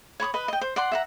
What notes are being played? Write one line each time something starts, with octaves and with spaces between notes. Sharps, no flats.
C#5 B5 C#6 D#6
B4 D#5 B5
D#5 G5
C5
D5 F#5 C6
E5 F#5 A#5